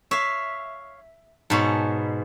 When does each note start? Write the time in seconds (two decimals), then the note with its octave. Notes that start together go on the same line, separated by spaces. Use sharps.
0.11 C#5 E5 F5
1.50 G#2 B2 C#5 A5